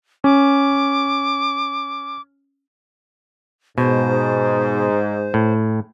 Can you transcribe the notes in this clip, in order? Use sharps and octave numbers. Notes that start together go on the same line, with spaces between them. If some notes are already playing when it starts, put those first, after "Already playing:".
C#4 D6
G#2 B2 C5
A2